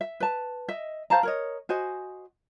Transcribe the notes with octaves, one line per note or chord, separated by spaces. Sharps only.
E5
B4 A5
D#5 E5
C5 F5 A5 A#5
A#4 C#5 D#5
F#4 C5 D#5 G#5